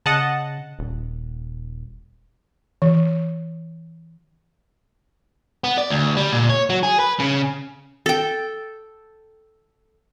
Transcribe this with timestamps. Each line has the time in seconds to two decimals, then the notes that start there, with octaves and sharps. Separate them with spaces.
0.06 C#3 D#5 F#5 A5
0.79 D#1
2.82 E3
5.64 B3
5.78 D5
5.90 D2
6.17 G3
6.32 A#2
6.49 C#5
6.70 F#3
6.83 G#4
7.00 B4
7.20 C#3
8.06 A4 G5